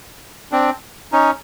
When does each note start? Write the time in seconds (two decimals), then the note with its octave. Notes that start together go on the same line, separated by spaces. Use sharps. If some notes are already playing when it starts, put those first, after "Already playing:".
0.52 C4 D4
1.12 C#4 D#4